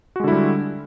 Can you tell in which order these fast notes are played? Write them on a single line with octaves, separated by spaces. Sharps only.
F#4 G#3 D3 E4 G3